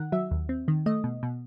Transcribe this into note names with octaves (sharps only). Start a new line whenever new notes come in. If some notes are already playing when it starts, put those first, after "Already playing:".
Already playing: D#3 F#5
F#3 E5
D#2
C4
D#3
A3 D#5
B2
B2